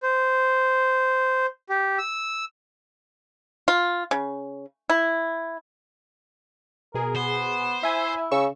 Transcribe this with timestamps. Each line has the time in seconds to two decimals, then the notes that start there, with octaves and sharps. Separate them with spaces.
0.03 C5
1.69 G4
1.98 E6
3.68 F4
4.11 C#3
4.90 E4
6.94 B2 G#4 A#4
7.15 B3 C5
7.83 E4 E5 G#5
8.31 C#3 C#6 E6